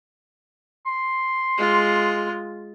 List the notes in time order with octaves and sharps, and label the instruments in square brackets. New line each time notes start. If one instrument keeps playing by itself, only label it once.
[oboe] C6
[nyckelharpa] G#3 F4